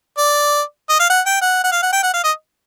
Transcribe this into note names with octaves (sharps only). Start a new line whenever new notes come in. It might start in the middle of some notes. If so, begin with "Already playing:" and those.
D5
D#5
F5
F#5
G5
F#5
F#5
F5
F#5
G5
F#5
F5
D#5